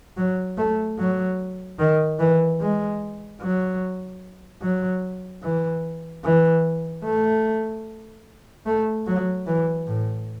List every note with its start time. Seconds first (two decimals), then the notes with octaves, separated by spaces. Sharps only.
0.17 F#3
0.57 A3
0.98 F#3
1.79 D#3
2.19 E3
2.60 G#3
3.41 F#3
4.62 F#3
5.42 E3
6.24 E3
7.04 A3
8.66 A3
9.07 F#3
9.46 E3
9.87 A2